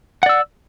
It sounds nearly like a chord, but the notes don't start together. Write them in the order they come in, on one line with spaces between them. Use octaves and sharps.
F#5 D5 E6